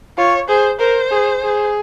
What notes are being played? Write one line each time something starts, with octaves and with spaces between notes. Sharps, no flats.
F4 C#5
G#4 C5
A#4 C5
G#4
G#4